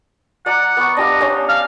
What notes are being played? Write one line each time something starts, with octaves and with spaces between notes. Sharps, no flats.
D5 F#5 A#5
B3 C#6
D4 G4 D#5 F5
C#4 D4 C5
F5